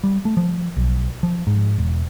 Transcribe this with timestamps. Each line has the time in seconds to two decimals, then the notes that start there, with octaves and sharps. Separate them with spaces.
0.04 G3
0.25 A3
0.37 F3
0.77 B1
1.23 F3
1.47 G#2
1.78 E1